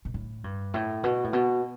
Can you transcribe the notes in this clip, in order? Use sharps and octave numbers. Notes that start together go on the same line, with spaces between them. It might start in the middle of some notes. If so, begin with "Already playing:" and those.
B2
A2
G2
A2
B2
A2
B2